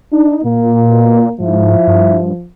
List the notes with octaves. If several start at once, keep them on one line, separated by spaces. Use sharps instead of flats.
D4 D#4
A#2 A#3
B2
G#2 F3 E4
G2